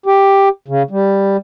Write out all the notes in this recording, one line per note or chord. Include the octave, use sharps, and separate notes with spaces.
G4
C#3
G3